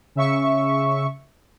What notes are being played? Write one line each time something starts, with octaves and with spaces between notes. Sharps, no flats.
C#3 E5 C#6